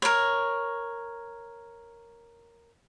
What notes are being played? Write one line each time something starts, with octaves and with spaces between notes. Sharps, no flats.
A#4 C#5